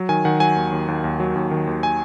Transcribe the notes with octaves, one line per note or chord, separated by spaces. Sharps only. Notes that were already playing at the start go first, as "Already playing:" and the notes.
Already playing: F#3
D#3 G#5
D#3 F#5
F#3 G#5
D#2
D#2
D#2
D#2
F#3
D#2
D#3
D#2
G#5